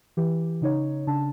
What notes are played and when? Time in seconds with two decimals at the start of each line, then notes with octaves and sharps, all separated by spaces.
0.17 E3 G4
0.62 C#3 D#4 C#5
1.07 C#3 D4 A5